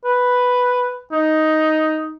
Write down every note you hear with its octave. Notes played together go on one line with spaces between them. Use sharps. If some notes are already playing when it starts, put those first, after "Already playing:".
B4
D#4